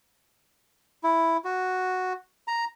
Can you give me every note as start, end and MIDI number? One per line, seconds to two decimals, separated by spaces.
1.04 1.37 64
1.45 2.13 66
2.48 2.65 82